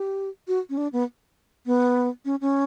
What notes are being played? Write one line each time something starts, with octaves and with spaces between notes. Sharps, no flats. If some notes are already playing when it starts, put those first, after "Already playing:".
Already playing: G4
F#4
C#4
D4
B3
B3
C#4
C#4